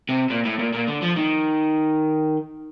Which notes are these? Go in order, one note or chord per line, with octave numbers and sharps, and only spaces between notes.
C3
A#2
A2
A#2
A#2
D3
F3
D#3